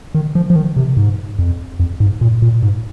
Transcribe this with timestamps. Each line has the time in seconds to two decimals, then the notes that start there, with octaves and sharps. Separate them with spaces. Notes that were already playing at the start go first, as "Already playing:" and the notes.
0.15 D#3
0.35 F3
0.50 F3
0.56 D#3
0.76 C3
0.97 G#2
1.39 F2
1.80 F2
2.00 G#2
2.21 A#2
2.42 A#2
2.62 G#2